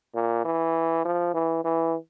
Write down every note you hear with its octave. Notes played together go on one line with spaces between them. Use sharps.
A#2
E3
F3
E3
E3